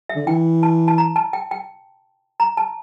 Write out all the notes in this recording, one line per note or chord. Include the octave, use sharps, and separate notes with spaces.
E5
D3
E3 G5
A5
A5
A#5
A5
G5
G5
A#5
A5